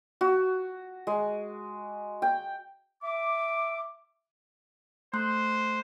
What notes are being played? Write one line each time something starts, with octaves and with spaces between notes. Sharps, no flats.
F#4
G#3
G5
E5 D6
A3 C5 C6 F#6